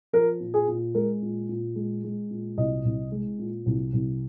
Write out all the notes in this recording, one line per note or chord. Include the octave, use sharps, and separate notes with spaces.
F3 A#4
A#2
G#4
A#2
G#3 A#4
A#2
A#2
G#3
G#3
A#2
C2 D#5
C2
G#3
A#2
C2
C2